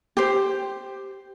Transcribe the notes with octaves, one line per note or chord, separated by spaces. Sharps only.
G4 C5